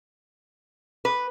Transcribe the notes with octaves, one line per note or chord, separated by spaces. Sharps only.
B4